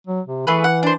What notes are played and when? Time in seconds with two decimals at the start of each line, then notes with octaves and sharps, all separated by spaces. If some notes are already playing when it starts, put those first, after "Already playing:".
0.07 F#3
0.27 C3
0.47 E3 A3 G#4 B4
0.64 F#5
0.83 D4 C5